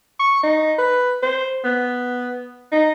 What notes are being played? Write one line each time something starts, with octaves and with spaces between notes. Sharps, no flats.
C#6
D#4
B4
C5
B3
D#4